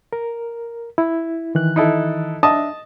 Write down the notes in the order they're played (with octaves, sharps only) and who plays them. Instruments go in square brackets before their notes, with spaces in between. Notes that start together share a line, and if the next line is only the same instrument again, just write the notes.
[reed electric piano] A#4
E4
D#3 E3 F#6
[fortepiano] D#4 E4 A4
[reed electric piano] D4 E5 [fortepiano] D#5 A5 D#6